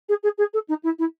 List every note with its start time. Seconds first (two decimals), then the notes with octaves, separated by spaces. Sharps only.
0.09 G#4
0.23 G#4
0.38 G#4
0.53 A4
0.68 D#4
0.83 E4
0.99 E4